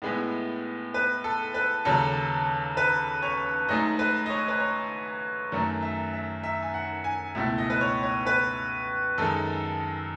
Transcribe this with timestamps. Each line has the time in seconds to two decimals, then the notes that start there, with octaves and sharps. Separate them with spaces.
0.02 A2 G#3 B3 E4
0.94 B4
1.24 A4
1.54 B4
1.85 D#2 C#3 F#3 A4
2.77 B4
3.23 C#5
3.68 G#2 F#3 A3 D#4 D#5
3.99 B4
4.26 D#5
4.30 C#5
4.48 B4
4.60 C#5
5.52 F#2 D#3 F#3 A3
5.82 E5
6.13 E5
6.44 E5
6.63 G#5
6.74 F#5
7.04 G#5
7.35 C#2 B2 A3 E4 E5
7.58 D#5
7.70 B4
7.81 C#5
8.03 C#5
8.27 B4
9.18 F#2 D#3 G#3 A4